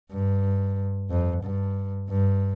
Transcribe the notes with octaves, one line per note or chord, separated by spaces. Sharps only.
G2
F2
G2
G2